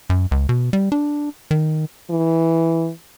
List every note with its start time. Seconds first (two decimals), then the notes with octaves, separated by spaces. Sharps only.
0.10 F#2
0.31 C#2
0.49 B2
0.73 G3
0.92 D4
1.51 D#3
2.10 E3